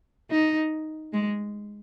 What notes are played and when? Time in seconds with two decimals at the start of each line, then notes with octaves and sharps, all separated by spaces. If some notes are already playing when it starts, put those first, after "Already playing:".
0.31 D#4
1.13 G#3